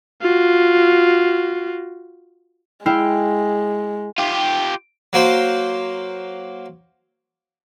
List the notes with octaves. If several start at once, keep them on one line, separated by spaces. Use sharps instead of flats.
F4 F#4
G#3 E4 F5 G5
F4 G4
F#3 A#3 C5